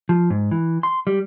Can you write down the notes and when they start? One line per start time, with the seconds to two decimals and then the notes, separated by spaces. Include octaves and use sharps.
0.09 F3
0.30 G#2
0.51 E3
0.83 C6
1.07 G3